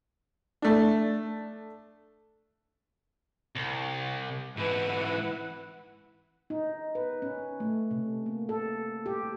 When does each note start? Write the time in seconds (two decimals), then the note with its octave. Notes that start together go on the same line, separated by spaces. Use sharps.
0.62 A3 D4
3.55 C2
4.57 G#2 E3 E4 B4 F#5
6.50 D#4
6.95 B4
7.22 C#4
7.60 A3
7.91 C3
8.26 A#3
8.49 A4
9.06 G4